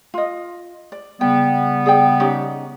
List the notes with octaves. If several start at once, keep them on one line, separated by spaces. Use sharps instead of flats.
F4 D#5
D5
C#3 G3 B3 G5
G#4 D5 G5
C#4 D#4 G4